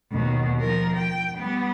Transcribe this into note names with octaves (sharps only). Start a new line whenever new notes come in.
D#2 B2
F3 A#4
G5
G3 B3